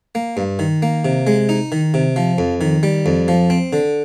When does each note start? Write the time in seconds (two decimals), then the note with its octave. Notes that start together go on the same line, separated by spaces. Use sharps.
0.15 A#3
0.37 G2
0.59 D#3
0.82 A#3
1.05 C3
1.27 G#3
1.49 D#4
1.72 D#3
1.94 C3
2.16 F3
2.38 F2
2.61 D#3
2.83 G3
3.06 F2
3.28 F3
3.50 C4
3.73 D3